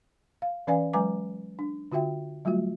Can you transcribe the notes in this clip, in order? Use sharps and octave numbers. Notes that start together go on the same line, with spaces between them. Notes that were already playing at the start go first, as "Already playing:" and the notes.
F5
E3 C#4 B4 D5 F5 G#5
F#3 G#3 B4 G#5 A#5 D6
D4
D3 F4 F#4 E5 G5
F#3 G3 A3 F4 F#4